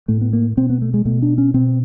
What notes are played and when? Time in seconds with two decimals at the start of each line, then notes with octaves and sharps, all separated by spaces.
0.08 A2 A3
0.21 B3
0.33 A#3
0.57 B2 C4
0.70 B3
0.82 A3
0.94 G#3
1.05 B2 A3
1.22 D4
1.38 C#4
1.54 B2 C4